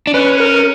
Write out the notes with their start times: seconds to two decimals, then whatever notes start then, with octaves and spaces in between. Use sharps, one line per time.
0.07 D4
0.14 C#4 B4
0.40 A#4